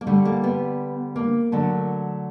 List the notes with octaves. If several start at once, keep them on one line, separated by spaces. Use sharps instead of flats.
A#3
D3 G3 A3
A#3
B3
A#3
D3 F#3 A3